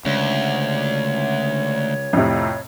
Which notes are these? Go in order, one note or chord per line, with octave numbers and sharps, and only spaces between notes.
D2 C#3 G#3 C#5
F2 A2 C3